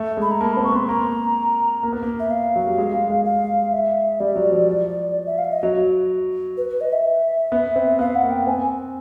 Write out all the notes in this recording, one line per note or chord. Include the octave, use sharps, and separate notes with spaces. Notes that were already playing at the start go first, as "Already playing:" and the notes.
Already playing: A3
G#3 B5
A#5
A#3 A5
C4 B5
C#6
B3 C6
A#3 A#5
A#3
B3
A#3
E5
F5
F#3
G3
G#3
G#3
G#3
F5
E5
G3 D5
F#3
F3
E5
F5
E5
D#5
F#3
B4
B4
D#5
E5
B3
C4
B3 F5
F#5
A#3
G5
C4 G#5